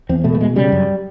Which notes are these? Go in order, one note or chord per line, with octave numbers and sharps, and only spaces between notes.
E2 C4
B2 A3
A3
B2 G#3
C#3 G3
F#2